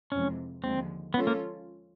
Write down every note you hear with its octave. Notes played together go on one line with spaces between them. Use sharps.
F2 C3 E3 G#3 C#4
D#2 D3 F3 G#3 C4
F3 G#3 B3 C#4 F4 A4
A#3